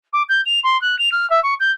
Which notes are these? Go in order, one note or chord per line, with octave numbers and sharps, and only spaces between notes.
D6
G6
F7
C6
F#6
F7
F6
E5
C#6
G6